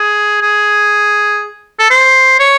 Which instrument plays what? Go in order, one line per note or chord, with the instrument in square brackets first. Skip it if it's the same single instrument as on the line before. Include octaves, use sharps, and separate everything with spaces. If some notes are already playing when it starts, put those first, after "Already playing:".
Already playing: [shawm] G#4
G#4
A4
C5
C#5